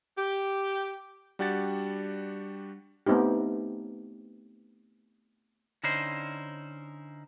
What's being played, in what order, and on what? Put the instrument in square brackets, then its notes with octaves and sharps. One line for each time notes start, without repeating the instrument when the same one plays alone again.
[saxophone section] G4
[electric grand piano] G3 D4 F#4 G4 F#5 A6
[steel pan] A3 B3 C4 D#4 G4
[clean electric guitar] D3 C#4 D#4 E4 C5